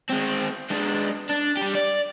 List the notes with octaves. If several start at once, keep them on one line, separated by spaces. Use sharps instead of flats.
G#3 C4
G#3 D4
D4
G3 G4
D5